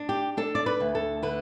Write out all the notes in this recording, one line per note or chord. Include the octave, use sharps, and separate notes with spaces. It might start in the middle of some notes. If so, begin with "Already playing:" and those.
Already playing: D4
G4
D4 A4
D5
B4
D2
A4
D3 B4